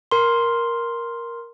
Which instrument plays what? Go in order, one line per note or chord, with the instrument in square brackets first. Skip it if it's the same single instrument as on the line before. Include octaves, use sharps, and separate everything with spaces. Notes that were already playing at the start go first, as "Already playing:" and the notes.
[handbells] A#4 C6